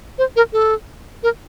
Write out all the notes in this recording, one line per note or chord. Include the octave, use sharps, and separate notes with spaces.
C5
A#4
A4
A#4